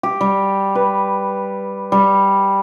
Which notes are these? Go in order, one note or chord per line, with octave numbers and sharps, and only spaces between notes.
G4
G3
B4
G3